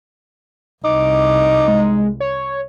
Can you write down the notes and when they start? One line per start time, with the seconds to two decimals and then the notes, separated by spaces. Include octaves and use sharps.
0.84 C2 D#4 D6
1.68 G#3
2.20 C#5